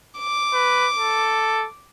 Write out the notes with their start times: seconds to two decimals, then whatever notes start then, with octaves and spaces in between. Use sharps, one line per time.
0.19 D6
0.54 B4
0.96 A4